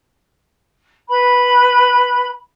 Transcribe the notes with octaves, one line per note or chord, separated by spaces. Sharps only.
B4 B5